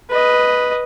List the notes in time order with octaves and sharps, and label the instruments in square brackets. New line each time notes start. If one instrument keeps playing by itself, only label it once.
[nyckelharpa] B4 D#5